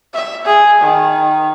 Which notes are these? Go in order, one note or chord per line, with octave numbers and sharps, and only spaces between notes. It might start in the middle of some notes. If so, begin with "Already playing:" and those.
E5
G#4
D#3